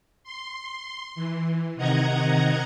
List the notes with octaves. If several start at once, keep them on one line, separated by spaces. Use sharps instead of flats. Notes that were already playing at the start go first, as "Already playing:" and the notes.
C6
E3
C3 D#3 D#5 F#5 A#5 G#6